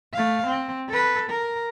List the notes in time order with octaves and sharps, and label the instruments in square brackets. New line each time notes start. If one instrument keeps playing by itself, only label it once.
[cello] A3 F5
C4
A4 B4
A#4